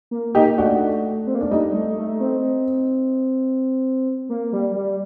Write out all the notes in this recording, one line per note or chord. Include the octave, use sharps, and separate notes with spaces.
A#3
A#3 D#4 G4
A3 D4 F#4
C4
A#3
A3 D4
G3 D#4
A3
A3
C4
A#3
G3
G3